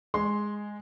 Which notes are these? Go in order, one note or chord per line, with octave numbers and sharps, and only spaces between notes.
G#3 C6